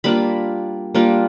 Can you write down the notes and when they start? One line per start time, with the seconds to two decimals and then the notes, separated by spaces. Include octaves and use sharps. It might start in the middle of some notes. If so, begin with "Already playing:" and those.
0.04 G3 A#3 D4 F4 B5
0.95 G3 A#3 D4 F4